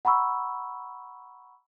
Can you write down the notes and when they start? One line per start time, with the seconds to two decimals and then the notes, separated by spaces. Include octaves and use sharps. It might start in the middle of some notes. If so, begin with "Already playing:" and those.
0.05 F#5 A#5 B5 C#6 E6